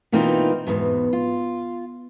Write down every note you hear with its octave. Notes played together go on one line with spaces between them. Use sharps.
B2 E3 A#3 C4 D#4 F4
E2 G#2 B2
F4